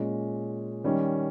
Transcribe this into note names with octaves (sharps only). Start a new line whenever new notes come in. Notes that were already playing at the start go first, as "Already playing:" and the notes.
Already playing: A#2 G#3 C#4
D#3 G3 C#4